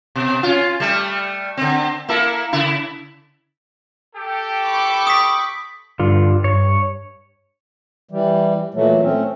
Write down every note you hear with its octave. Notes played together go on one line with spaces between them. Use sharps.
B2
C#4 F4
G3 A3
D3 C4
A#3 E4 A4
C#3 E4
G4 A4
B5 C#6 D6
D#6 B6
G2 D3 F4
G2 C#5
E3 G3
A#2 E3 F#3 A3
A3 C4 C#4